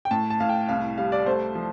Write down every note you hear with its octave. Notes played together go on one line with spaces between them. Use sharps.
G5
A2 A5
A5
A2 F5
G5
C2 F5
G3 F5
D5
A3 C5
F3